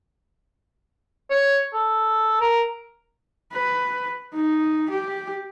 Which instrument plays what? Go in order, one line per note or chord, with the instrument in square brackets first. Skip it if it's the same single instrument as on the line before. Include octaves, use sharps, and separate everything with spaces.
[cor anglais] C#5
A4
A#4
[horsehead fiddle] B4
D#4
G4